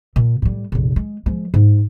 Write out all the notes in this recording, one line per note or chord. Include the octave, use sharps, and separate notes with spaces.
A#2
A2 G3
F1 A#1
G#3
F3 G#3
G#2